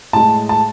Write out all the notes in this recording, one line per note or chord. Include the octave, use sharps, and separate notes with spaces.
A2 G#3 A5
A5